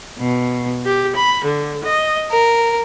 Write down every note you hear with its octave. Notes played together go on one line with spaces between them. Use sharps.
B2
G4
B5
D3
D#5
A#4